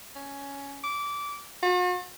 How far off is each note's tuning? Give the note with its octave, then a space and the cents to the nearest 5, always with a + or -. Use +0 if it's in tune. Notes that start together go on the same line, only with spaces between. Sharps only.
C#4 +10
D6 -20
F#4 -45